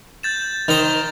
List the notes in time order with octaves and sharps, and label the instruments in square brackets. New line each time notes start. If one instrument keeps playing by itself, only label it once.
[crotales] G6 A6 E7
[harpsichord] D#3 C5